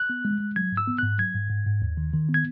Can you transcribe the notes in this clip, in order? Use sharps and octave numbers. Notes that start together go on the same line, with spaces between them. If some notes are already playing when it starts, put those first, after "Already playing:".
Already playing: F#6
B3
G#3
G#3
F#3 G#6
G#2
E6
B3
G#2 F#6
F#3 G#6
G#2
G#2
G#2
D#2
D#3
D#3
B3
G#6